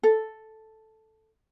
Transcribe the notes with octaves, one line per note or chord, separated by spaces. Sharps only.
A4